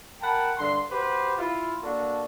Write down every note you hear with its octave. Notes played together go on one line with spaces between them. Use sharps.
A#4 F#5 G5 A5 B5
G2 D3 C6
F#4 G4 B4 C5
E4 F4
A#3 D4 F#4 A4